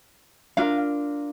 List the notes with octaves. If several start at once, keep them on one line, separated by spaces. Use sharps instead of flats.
D4 F4 A#4 F5